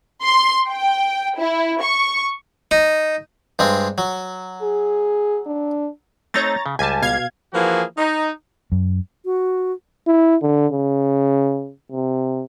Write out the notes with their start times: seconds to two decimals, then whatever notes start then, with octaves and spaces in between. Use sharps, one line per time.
0.25 C6
0.69 G5
1.37 E4
1.81 C#6
2.71 D#4
3.59 G2 G#3 C4
3.98 F#3
4.62 G#4
5.46 D4
6.34 A3 C4 D#4 C#5 A#5 A6
6.66 C#3
6.79 C#2 G3 G#5 A5
7.02 B2 F5 G#6
7.53 E3 F3 A#3 F#4 G#4
7.97 D#4
8.72 F#2
9.25 F#4
10.07 E4
10.42 D3
10.72 C#3
11.92 C3